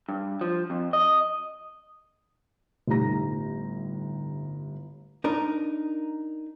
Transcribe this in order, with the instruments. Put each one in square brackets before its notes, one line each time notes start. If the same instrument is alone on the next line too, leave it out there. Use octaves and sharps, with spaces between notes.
[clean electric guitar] G2
F3
F2
D#5
[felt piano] G1 A2 D#4 G4 A#5 A#6
[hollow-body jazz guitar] D4 D#4 A#4